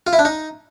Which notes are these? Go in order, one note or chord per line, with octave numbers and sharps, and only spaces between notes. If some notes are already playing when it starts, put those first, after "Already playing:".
F4
E4
D4
D#4